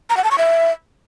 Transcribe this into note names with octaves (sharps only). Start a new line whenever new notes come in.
A#5
F#5
A5
C#6
E5